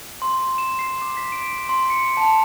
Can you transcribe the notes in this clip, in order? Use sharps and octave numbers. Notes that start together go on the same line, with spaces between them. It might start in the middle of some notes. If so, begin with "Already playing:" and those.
C6
E7
C7
D6
B6
D7
C6
C#7
A5